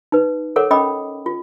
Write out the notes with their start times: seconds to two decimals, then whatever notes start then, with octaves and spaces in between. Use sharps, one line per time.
0.12 D#4 B4
0.56 A4 A#4 C#5 F#5 D6
0.71 C#4 D#5 G5 B5 D6 D#6
1.26 F4